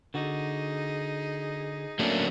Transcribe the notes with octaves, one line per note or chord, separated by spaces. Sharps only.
D3 D#4 F#4 G#4
F#3 A3 A#3 C#4 D4 A#4